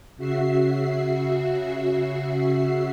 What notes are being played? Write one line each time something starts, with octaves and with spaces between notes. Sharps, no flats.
C#3 F#4 E5 C7